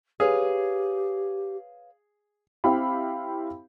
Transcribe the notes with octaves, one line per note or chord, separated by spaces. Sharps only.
G4 G#4 B4 C#5 F5
C4 E4 G4 F5 B5